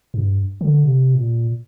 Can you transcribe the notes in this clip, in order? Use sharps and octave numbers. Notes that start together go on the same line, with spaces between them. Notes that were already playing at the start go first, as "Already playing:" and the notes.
G2
D3
C3
A#2